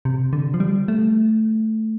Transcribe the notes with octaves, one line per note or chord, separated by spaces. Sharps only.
C3
D3
F3
G3
A3